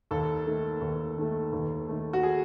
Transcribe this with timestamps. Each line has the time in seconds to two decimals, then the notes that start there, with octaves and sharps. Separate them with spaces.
0.11 D#2 A4
0.46 D#3 A3
0.81 D#2
1.17 D#3 A3
1.52 D#2
1.88 D#3 A3
2.13 F#4
2.23 G#4